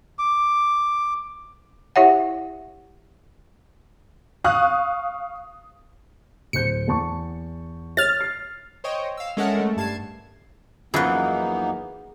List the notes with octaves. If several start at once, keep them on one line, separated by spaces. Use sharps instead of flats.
D6
E4 G4 C#5 E5 F#5
F5 C#6 D#6 F#6
D1 C5 G6 C#7
E2 A5 C#6
C#5 F6 A6
C7
C5 C#5 D#5 G5
F5 E6
G#3 C#4 A4 A#4 E5 F#5
A3
G2 A5 G#6 C7 E7
F#2 E3 F3 A#3 B3 D#4 G#4 B4